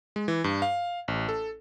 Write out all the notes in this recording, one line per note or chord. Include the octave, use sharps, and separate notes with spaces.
G#3
E3
G2
F5
A1
A4